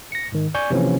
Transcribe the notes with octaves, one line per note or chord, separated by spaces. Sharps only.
A#6 C#7
G#2 D#3
D5 G#5 C#6 G6
C3 E3 F3 A#3 C#4